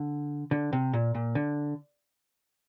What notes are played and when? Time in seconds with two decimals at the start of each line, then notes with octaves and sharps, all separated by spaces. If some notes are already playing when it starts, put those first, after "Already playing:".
Already playing: D3
0.51 D3
0.73 C3
0.93 A#2
1.15 A#2
1.35 D3